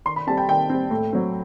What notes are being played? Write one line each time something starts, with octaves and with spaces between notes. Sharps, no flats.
D#3 C6
B5
G3 C4 A5
G5
D#3 G5
G3 C4
A2
F#3 C4